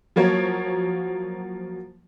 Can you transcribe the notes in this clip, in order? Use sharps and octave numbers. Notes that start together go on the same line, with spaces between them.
F3 F#3 A#3 C#5